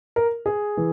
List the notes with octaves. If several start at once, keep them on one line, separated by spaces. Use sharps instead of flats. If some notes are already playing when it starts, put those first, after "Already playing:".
A#4
G#4
E3